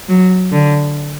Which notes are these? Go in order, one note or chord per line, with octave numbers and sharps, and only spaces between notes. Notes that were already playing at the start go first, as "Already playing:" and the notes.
F#3
D3